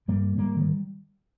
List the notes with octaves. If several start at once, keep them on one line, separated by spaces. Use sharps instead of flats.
G2 G3 A#3
G#2 G3 A#3
D#3 G3